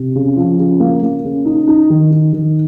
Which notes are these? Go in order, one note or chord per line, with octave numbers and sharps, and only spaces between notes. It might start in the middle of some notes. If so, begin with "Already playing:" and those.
Already playing: C3
C#3
F3
C#3
A#3
A#3
C#3
D#4
D#4
D#3
D#4
D#3